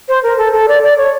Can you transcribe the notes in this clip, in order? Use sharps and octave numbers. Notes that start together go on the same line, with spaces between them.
C5
A#4
A4
A4
D5
D5
C#5